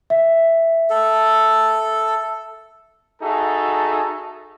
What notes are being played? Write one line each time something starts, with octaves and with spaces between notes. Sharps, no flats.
E5
A4
D#4 F#4 G#4 A4 E5 A5